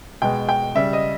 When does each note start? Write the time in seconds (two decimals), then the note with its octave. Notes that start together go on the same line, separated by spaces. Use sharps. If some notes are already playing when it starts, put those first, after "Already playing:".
0.22 B2 G#3 G5
0.49 G5
0.75 C#3 G3 E5
0.93 D#5